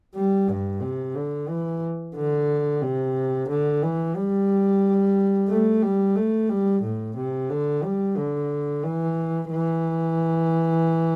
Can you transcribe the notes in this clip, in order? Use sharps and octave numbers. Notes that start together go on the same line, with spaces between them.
G3
G2
C3
D3
E3
D3
C3
D3
E3
G3
A3
G3
A3
G3
A2
C3
D3
G3
D3
E3
E3